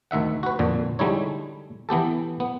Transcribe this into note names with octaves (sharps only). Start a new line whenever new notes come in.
D2 D#3 E5 F#5
F#4 B4
F2 A#2 D3
D3 G3 G#3 D#4 E4 C#5
E3 B3 G4 A4
B3